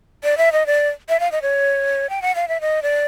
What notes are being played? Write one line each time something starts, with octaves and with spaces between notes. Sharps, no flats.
D5
E5
D#5
D5
E5
F5
D#5
C#5
G5
F#5
F5
E5
D#5
D5